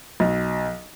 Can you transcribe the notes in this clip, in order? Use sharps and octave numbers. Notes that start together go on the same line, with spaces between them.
B1